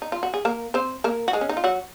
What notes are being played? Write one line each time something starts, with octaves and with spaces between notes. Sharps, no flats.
D#4
F4
F#4
G#4
A#3 A#4
C4 C5
A#3 A#4
F#4
G#3 G#4
C#4
D#4
F4
F#3 F#4